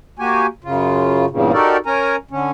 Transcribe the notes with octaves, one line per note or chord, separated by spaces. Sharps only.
A#3 F#4 G4 G#5
F#2 C#3 F4
E2 G2 A#2 C#3
D#4 F#4 G4 A4 A#4 D5
C#4 A#4 G#5 A#5
D3 C#4